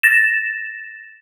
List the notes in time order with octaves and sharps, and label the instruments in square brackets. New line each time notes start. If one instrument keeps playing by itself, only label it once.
[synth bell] A6 A#6 E7